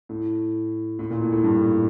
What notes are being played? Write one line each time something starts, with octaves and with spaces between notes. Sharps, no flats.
A2
A2
A#2
A2
A2
G2